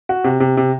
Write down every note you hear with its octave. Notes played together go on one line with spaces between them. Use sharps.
F#4
C3
C3
C3